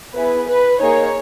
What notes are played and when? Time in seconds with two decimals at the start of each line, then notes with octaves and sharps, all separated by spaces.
0.15 B3 E4 G#4 B4
0.48 B4
0.81 A#3 D#4 G#4 C#5